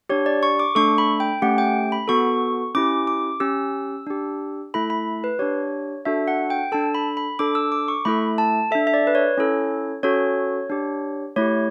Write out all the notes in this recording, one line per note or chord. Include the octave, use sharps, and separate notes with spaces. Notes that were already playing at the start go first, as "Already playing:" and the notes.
D4 G4 C#5
D5
C#6
D6
A3 D4 A4 C#6
B5
G5
A3 C#4 G4 F#5
G5
B5
B3 F#4 A4 C#6
C#4 E4 G4 D6
D6
C#4 G4 E6
D4 G4
A3 E4 A4 B5
B5
B4
D4 G4 C#5
D4 F#4 A4 E5
F#5
G5
D4 A4 A5
B5
B5
D4 A4 D6
E6
D6
C#6
A3 E4 A4 B5
A5
D4 A4 E5
E5
D5
B4
C#5
C#4 E4 A4
C#4 F#4 A4 C#5
D4 G4
A3 E4 G4 C#5